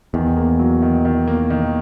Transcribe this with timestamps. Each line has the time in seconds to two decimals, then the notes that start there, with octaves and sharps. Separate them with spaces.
0.14 E2 D#3
0.37 A#3
0.59 F#3
0.82 D#3
1.05 D#3
1.27 A#3
1.50 D#3